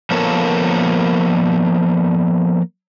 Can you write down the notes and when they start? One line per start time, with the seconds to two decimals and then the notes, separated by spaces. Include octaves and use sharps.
0.11 F3 A#3 B3 A4 A#4 C#5